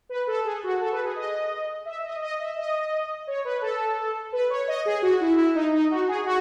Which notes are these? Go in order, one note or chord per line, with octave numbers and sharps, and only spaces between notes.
B4
A4
G#4
F#4
A4
B4
G#4
D#5
E5
D#5
D#5
E5
D#5
C#5
B4
A4
B4
C#5
D#5
G#4
F#4
E4
E4
D#4
D#4
F#4
G#4
F#4